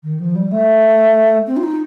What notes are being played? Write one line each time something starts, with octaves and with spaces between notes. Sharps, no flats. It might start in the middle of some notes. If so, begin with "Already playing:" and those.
D#3
F3
G3
A3
C4
F4
D#4